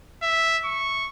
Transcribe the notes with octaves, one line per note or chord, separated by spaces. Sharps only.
E5
C#6